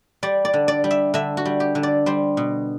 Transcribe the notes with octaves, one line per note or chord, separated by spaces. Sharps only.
G3 D5
D5
D3
D5
G3
E5
D3 E5
F#4
G3
G4
D3
D5
G3 C5
B2